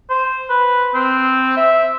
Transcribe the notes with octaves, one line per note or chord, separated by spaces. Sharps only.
C5
B4
C4
E5